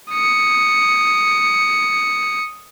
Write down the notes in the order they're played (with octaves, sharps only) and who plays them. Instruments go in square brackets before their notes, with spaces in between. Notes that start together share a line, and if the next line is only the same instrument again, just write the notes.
[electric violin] D#6 C#7